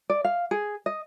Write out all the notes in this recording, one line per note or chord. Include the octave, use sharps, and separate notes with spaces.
D5
F5
G#4
D#5